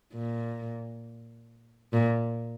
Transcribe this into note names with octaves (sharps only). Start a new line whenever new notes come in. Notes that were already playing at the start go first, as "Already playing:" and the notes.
A#2
A#2